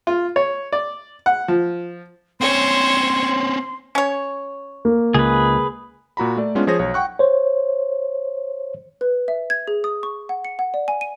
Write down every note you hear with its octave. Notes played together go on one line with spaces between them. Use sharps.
F4
C#5
D5
F#5
F3
C4 C#4 C5 C#5 C6
C#4 C#5
A#3
C#2 G#4 B4
A#2 F#4 A#5 B5
A3 D5
G#3 B3 C#4 D4 F4
F3 G#4 C5 C#5 D#6 A#6
B1 C#5
F#5 G5 C#6 F#6
C5 C#5
B4
E5
G#6
G#4
D#6
C#6
F#5
C#7
F#5
D5
G#5
D#7